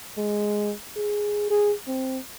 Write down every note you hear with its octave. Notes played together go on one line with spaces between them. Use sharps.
G#3
G#4
G#4
C4